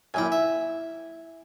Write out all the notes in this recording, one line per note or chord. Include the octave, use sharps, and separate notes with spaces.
F#2 A#2 E4 G5 G#5
E5